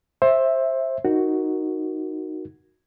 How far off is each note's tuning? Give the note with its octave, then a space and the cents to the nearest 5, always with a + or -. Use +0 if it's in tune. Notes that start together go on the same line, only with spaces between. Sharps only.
C5 +20 E5 -5
D#4 +0 F#4 +0 A#4 +0